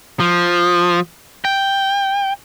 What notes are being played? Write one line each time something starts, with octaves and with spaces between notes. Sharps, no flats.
F3
G5